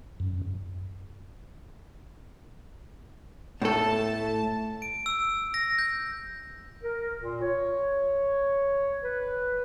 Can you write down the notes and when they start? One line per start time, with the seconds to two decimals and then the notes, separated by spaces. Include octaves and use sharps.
0.20 F#2
3.62 A2 A3 A4 A5
4.82 D7
5.06 E6
5.54 A#6
5.79 G6
6.83 A#4
7.20 A#2
7.42 C#5
9.04 B4